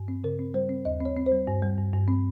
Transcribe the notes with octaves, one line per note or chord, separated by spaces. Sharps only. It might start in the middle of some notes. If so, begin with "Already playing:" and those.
Already playing: G2
C4
C#3 A#4
C4
G3 C5
C4
D#2 D#5
C4
C#5
C4
C5
G3
G2
G3
G2
G2
C4